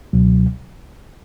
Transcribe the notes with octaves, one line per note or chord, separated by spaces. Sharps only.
C#2 B2 F#3